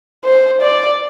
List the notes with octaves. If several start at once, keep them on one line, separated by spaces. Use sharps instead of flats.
C5
D5